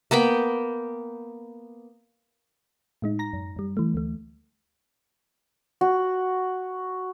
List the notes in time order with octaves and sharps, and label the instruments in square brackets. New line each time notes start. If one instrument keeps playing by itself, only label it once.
[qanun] A#3 B3 G5 B5
[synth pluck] A2 G#3 D#4
A#5 A#6
F#2
F#2 G3
E3 A3
D2 A3
[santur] F#4